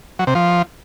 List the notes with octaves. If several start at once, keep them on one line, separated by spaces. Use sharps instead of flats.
F#3
C3
F3